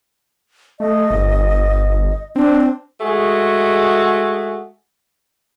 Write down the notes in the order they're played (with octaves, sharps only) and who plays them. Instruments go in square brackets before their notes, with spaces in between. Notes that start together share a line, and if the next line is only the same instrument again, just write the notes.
[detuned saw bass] A3 [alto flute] D#5
[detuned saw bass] G1
[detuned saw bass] C4 [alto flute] D4
[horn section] G#3 A3 F#4 G#4